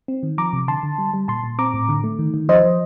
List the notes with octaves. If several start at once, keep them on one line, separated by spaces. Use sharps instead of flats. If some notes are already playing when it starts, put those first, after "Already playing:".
C4
D#3
F3 A#5 D6
C3
D3 A5 C6
D3
G3
G3
A#2 A5 C6
A#2
C4 A#5 D6
A2
D3
A3
D#3
D#3
F3 C5 D#5
F3